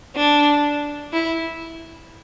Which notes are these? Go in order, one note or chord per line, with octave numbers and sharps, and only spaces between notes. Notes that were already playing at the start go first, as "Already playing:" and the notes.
D4
E4